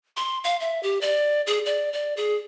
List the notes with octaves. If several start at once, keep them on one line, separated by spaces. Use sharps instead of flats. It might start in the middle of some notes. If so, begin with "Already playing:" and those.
C6
F5
E5
G4
D5
G#4
D5
D5
G#4